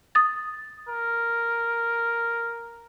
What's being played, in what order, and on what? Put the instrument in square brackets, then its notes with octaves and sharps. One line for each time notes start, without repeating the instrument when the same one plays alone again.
[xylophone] D#6 A6
[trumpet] A#4